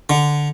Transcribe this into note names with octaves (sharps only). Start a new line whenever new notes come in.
D3